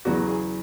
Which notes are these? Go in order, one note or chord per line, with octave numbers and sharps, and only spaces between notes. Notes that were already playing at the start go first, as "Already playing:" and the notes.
E2 C#3 F#3 F#4
G#4